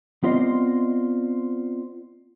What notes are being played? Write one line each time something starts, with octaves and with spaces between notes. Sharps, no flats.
B3 C4 F4 C5 D5 D#5